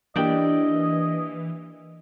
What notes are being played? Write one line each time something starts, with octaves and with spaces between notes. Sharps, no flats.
E3 A#3 D4 E4 G4 D5 D#5 G5